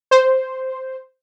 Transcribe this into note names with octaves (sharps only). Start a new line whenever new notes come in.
C5